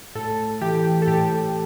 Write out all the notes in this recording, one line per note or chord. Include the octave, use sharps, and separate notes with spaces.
A2 A4
E3 G4
A4
A2 G4